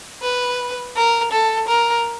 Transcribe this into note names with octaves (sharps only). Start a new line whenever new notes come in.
B4
A#4
A4
A#4